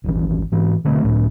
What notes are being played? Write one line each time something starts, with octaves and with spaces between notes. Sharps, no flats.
D#1 G#1 E3
G#2 E3
B2 D3 A3 C4
C#2 A2